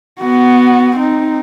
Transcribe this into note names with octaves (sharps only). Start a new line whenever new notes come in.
B3 F#4
C4 D#4